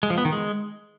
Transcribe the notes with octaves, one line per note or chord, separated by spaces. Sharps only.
G#3
F3
B3
D#3
G#3